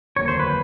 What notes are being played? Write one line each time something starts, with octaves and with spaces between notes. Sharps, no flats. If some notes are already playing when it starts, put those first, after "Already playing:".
F1 D#2 D3 F#3 A#3 C#5
C5
B4